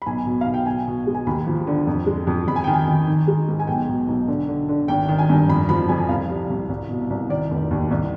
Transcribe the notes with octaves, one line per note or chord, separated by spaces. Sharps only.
B5
B1 G#5
B2
B1 F5
G5
B2 G#5
B2
G#3
G#5
D#2 B5
F3
D3
F2
G#3
F2
F2 B5
G#5
D#3 G5
G#5
D#3
D#3
G#3
G#2
G#5
B1 G5
B2
B1
D3
D3
D3
G#1 G5
D#3
G#5
G2
F2 B5
F3 B5
F2 G#5
C2 F5
G3
C2
C2
B2
C2
D#3 D5
F1
D#2
C2